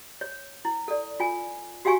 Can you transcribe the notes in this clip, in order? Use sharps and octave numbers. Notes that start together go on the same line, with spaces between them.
C#5
E4
A4 D5
F4 G#5
F#4 G4 F5 G#5 C#6